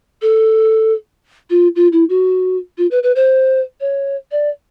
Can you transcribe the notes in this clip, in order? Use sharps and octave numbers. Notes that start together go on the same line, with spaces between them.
A4
F4
F4
E4
F#4
F4
B4
B4
C5
C#5
D5